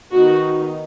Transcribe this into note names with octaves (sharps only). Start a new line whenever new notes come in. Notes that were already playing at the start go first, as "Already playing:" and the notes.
D#3 B3 D#4 F#4